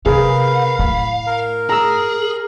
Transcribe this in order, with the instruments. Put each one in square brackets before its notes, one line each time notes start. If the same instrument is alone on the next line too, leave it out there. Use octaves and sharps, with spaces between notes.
[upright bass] C3 [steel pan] G#4 [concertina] A#4 B4 [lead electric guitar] F5
[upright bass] A2 [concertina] B5
[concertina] A#4
[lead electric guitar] G#4 [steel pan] A#5 E6